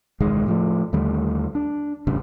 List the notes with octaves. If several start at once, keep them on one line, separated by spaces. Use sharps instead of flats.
E1 C#2 D#3 G#3
A2 F3 A3
D#2 D3 G3 A3
D4
D#1 A1 G2 C#3